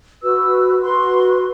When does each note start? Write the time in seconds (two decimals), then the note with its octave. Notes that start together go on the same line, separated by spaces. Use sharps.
0.22 F#4 B4 E6
0.83 F#4 B4 C6